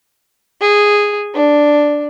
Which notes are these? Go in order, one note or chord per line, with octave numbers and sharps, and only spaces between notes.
G#4
D4